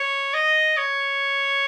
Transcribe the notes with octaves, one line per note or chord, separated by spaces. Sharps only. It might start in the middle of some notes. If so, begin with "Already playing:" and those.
Already playing: C#5
D#5
C#5